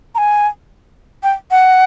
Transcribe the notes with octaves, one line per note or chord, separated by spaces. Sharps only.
A#5
G#5
G5
F#5